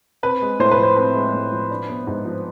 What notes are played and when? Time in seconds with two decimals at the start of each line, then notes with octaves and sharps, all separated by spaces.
0.23 C4 B4
0.42 G#3
0.59 A2 C5
0.71 B4
0.78 F3 C5
0.97 C4 B4
1.15 G#3
1.33 A2
1.52 F3
1.71 D4
1.89 B3
2.07 G#2
2.25 F3